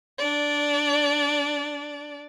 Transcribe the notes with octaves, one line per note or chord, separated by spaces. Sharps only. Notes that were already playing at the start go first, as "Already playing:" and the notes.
D4 D5